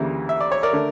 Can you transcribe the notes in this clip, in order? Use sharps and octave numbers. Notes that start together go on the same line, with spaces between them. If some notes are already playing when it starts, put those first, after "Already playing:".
Already playing: D2 C#3 E3 G3 A#3
E5
D5
C#5
A#4 D5
D3 A3